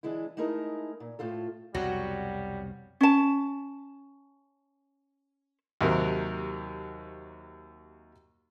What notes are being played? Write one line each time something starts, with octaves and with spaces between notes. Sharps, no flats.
D3 E3 G#3 D4 E4
G#3 A3 D#4 E4 A#4
A#2
A2 C4 F4 A4
C2 F2 B2 F#3 G3 F#4
C#4 A5
D#2 C3 F#3 A#4 C5